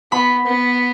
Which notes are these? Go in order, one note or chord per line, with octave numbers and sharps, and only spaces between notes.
B3 B5
B3